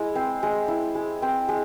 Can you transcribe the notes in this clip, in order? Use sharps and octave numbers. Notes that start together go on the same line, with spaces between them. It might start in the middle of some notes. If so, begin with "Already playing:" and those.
Already playing: G#3 E4
C4
G#3
E4
G#3
C4
G#3